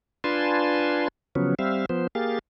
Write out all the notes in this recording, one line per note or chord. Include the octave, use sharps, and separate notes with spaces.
D4 F4 B4 G#5 A5 C6
C#3 F3 F#3 B3 C#4
G3 C4 E5 F5
F3 B3 C5
A#3 G4 G#4 F5 A6